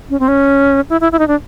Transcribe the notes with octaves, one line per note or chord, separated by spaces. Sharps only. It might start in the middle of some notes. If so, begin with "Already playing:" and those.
C#4
C4
C#4
E4
E4
E4
D#4
D4